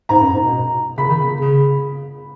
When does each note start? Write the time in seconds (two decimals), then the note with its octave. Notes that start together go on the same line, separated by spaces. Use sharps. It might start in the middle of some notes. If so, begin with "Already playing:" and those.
0.09 G#2 A#5
0.21 F#2
0.32 G#2
0.42 B2
0.97 C#3 B5
1.09 D#3
1.20 C#3
1.40 C#3